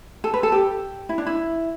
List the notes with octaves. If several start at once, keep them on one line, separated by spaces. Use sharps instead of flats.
A4
B4
A4
G4
E4
D4
E4